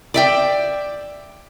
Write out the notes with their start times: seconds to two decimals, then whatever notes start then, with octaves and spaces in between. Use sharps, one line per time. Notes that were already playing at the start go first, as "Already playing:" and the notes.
0.14 D5 E5 G5